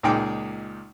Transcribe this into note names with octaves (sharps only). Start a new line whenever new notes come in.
C#2 A#2 G#3 D#4 G5 D6